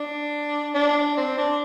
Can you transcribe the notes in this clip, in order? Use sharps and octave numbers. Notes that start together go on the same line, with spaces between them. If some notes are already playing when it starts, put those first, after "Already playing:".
Already playing: D4
D4
C4
D4